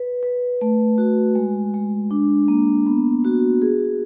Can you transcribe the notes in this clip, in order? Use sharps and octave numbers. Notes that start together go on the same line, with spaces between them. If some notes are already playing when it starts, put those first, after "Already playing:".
Already playing: B4
B4
A3
F#4
G#3
G#3
D4
A#3
B3
F#4
G#4